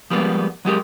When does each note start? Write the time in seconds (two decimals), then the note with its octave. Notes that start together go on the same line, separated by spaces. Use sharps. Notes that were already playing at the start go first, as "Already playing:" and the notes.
0.10 F3 G3 G#3 A#3 B3
0.65 F#3 G#3 G4 A#4